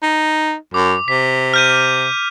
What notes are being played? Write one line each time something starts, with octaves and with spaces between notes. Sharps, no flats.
D#4
F#2 D6
C3 B6
F6 G6 D#7